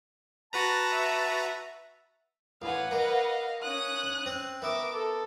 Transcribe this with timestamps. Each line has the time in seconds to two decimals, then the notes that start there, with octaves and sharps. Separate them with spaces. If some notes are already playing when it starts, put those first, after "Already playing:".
0.53 F#4 B4 A5 A#5
0.92 E5
2.62 A1 B4 F5 F#5 G#5
2.91 A#3 D#5 F5
3.62 C#4 D#6 F#6
4.26 C4
4.62 B3 A#4 E5 D6
4.93 A4